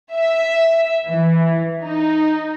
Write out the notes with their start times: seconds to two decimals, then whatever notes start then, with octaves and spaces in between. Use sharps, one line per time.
0.14 E5
1.08 E3
1.84 D#4